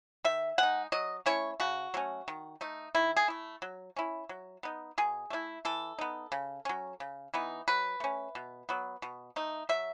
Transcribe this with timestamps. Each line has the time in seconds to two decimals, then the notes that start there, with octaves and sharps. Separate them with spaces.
0.25 D#3 E5
0.58 G#3 D#4 F#5
0.92 F#3 D#5
1.26 A3 C#4 E4 C#5
1.60 C#3 F#4
1.94 F#3 A3 C#4
2.28 D#3
2.61 A3 D#4
2.95 D#3 E4
3.17 G#4
3.28 A3 E4
3.62 F#3
3.96 C#4 E4
4.29 F#3
4.63 B3 D#4
4.98 B2 G#4
5.30 A3 C#4 E4
5.65 E3 A4
5.99 B3 D#4
6.32 C#3
6.65 F#3 C#4
7.00 C#3
7.34 E3 B3 D#4
7.68 F#3 B4
8.00 A3 C#4
8.35 B2
8.69 F#3 B3
9.02 B2
9.36 A3 D#4
9.69 F#3 E5